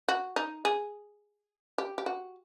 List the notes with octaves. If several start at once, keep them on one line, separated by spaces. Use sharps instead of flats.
F#4
D#4
G#4
G4
G4
F#4